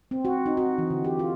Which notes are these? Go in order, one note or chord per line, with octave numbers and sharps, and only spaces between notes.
C4
F#4
D#4
F#4
E3
D3
G4
F4